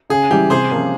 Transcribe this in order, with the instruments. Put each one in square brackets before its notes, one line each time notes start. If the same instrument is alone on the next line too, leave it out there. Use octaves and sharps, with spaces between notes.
[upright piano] C#3 [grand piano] G#4
[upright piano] E3 G3 [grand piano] G4
[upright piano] C3 [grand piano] G#4 C5
[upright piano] F3 A#3 C#4